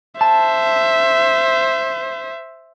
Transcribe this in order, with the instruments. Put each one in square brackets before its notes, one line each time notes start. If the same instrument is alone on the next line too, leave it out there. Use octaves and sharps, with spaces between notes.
[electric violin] C5 E5 [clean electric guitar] A5